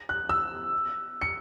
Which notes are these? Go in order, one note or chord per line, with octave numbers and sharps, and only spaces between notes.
F#6
E6
C#7